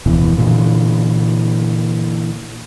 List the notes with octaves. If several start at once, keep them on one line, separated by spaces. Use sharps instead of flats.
D1 F2 B2 E3
A#2 D3 E3